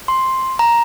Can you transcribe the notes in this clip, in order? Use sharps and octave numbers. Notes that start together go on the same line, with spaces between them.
C6
A#5